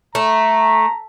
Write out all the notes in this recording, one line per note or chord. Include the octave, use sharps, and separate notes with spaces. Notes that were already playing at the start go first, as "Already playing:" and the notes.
A3 A#5